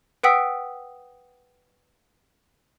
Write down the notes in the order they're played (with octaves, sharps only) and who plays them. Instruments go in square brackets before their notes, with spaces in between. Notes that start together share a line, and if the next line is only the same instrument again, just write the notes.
[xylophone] B4 F#5 G5 D#6 E6 B6